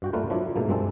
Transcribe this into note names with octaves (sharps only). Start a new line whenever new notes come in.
G2 F#4 G5
G3 A3 A#3 F4 B4
F3 F#3 D4 E4
G#2 B2 A3 A#3
G2 G#3 C4 A4